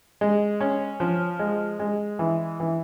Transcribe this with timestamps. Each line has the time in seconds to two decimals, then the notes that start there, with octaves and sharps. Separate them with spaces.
0.21 G#3
0.61 C#4
1.00 F3
1.39 G#3
1.79 G#3
2.19 E3
2.60 E3